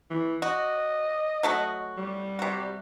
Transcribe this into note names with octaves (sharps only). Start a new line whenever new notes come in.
E3
F#4 D#5
F#3 A3 F#4
G3
C3 F#4